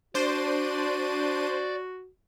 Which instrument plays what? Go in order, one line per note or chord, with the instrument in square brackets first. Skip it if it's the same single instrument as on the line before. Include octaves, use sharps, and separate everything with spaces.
[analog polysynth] D4 C6 D#7 [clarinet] F#4 [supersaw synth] C5 [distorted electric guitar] D5